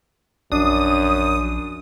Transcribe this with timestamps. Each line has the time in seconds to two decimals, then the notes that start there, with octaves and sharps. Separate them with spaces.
0.52 A#1 F#2 D4 D#6